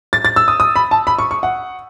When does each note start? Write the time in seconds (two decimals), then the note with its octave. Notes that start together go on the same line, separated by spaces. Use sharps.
0.13 A6
0.25 A6
0.36 E6
0.48 D#6
0.60 D#6
0.76 B5
0.91 A5
1.07 B5
1.19 C#6
1.31 C#6
1.43 F#5